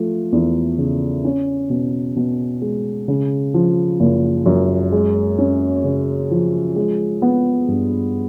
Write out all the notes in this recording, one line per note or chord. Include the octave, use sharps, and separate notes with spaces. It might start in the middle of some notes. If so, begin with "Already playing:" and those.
Already playing: F3 A3
E2
C#3
C#4
B2
B2
G#3
C#3
F3
F#1
F#2
G#3
C#4
C#3
F3
G#3
B3
G2